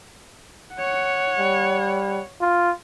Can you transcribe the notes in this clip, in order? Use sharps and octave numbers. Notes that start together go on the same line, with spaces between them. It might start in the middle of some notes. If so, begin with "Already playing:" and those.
C#5 F#5
G3
F4